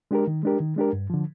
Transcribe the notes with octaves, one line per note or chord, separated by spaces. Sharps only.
G#3 D4 G4 A#4
D#3
G#3 D4 G4 A#4
D#3
G#3 D4 G4 A#4
G2
D3 F3